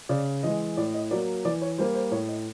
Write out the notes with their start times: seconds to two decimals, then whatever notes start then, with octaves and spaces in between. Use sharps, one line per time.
0.09 C#3 D5
0.43 E3 G#3 D#5
0.77 A2 D5
0.94 D#5
1.11 F#3 A#3 D5
1.45 E3 D5
1.62 C#5
1.78 G3 A#3 C5
1.94 C5
2.11 A2 C#5
2.29 D#5